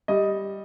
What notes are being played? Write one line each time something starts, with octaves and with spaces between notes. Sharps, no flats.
G3 D#5